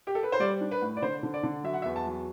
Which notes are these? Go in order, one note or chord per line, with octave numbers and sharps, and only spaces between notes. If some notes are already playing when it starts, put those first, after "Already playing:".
G4
A4
B4
C5
G3 D5
D4
B4
A2
D5
D3 C5
D3
D5
D3
F#3 E5
F#5
E5
E2
A5
F#3